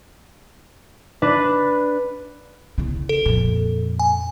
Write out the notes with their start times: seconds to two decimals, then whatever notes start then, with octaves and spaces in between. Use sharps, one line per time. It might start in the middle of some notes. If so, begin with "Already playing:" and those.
1.22 D4 B4
2.78 E2 C#3
3.09 A4
3.25 F2 A#2
3.99 G#5